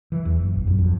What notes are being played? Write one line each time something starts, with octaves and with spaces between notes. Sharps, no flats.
E3
E2
F#1
A#1
F#2
F2